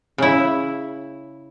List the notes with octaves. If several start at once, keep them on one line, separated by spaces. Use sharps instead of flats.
C#3 E4